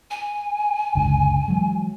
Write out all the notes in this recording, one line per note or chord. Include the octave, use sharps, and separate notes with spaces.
G#5
F#1 C#2 D3
E3 F#3 G#3